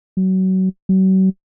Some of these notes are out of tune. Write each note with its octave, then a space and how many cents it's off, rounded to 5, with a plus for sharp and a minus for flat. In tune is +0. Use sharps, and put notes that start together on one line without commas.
F#3 +25
F#3 +40